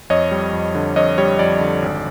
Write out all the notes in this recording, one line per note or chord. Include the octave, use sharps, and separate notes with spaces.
F2 C#5 D#5
G3
F2
D3
F2 C#5 D#5
G3 C#5
F2 D5
D3
G#1